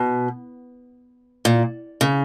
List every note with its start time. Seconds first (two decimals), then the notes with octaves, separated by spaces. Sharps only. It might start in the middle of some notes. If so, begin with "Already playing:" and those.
Already playing: B2
1.45 A#2
2.01 C#3